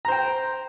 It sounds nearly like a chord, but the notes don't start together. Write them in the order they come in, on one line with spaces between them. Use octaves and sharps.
A#5 C5 G5